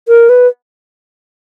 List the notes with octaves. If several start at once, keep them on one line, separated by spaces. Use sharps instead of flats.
A#4
B4